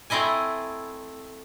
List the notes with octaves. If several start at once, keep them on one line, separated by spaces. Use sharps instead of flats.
A3 C4 E4 D#5 G#5